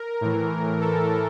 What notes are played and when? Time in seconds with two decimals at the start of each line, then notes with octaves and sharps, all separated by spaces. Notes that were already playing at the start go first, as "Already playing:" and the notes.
Already playing: A#4
0.21 A2 E3
0.81 A4